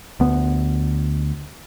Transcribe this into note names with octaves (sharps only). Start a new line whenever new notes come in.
D2 B3